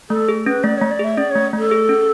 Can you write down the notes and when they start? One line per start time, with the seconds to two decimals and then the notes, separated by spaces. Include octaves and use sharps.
0.10 A3 A4
0.29 G#4
0.46 C#4 B4
0.64 A3 D5
0.78 A3 C#5
0.91 D5
0.99 G#4 E5
1.17 C#4 D5
1.31 A3 C#5
1.53 A3 A4
1.71 G#4
1.89 C#4